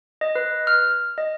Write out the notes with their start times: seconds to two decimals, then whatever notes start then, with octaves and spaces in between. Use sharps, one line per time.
0.21 D#5
0.35 B4
0.67 F6
1.18 D#5